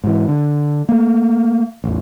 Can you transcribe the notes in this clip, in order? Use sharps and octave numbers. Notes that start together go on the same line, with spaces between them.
G#2 E3
D3
A3 A#3
A1 E2